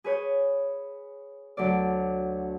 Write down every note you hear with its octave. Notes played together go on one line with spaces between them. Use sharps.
G#4 B4 C#5 G6
D2 F#3 A4 D5